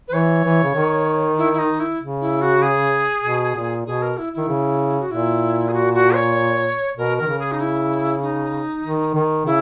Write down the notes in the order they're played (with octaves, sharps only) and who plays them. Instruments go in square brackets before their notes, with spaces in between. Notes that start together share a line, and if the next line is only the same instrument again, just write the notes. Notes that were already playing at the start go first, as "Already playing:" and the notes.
[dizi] B4
[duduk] E3 [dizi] C#5
[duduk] E3
C#3
D#3
[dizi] E4
E4
D#4
E4
[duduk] C#3
[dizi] E4
F#4
G#4
[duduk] B2
A#2
[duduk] B2 [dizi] G#4
[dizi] A#4
E4
[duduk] D#3 [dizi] E4
[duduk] C#3
[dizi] F#4
[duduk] A#2 [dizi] E4
[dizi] G#4
F#4
F#4
C#5
[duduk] B2 [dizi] A#4
[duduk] D#3 [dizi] A#4
[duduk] C#3
[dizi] G#4
D#4
E4
D#4
[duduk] D#3
D#3
[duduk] C#3 [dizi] E4